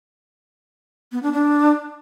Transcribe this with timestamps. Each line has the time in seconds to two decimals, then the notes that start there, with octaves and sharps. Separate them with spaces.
1.12 B3
1.23 D4
1.33 D4